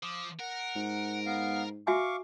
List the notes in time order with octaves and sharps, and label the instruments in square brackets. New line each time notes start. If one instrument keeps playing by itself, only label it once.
[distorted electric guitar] F3 [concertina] D6 D#6
[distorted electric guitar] A#4 [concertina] F#5
[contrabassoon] G#2
[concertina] B3 F5
[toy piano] F#4 E5 G#5 [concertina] F5 C#6 D6